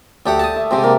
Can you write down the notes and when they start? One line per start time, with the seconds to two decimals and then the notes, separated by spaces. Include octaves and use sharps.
0.26 D2 A3 G4 D5 F#5
0.39 A5 D#6
0.56 E5
0.71 G#2 C3 C4 G4 D6
0.84 A#3 D5